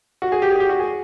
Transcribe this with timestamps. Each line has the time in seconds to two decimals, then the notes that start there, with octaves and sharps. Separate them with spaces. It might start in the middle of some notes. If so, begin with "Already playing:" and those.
0.22 F#4
0.32 G#4
0.42 G4
0.51 G#4
0.60 G4
0.69 F#4
0.80 G#4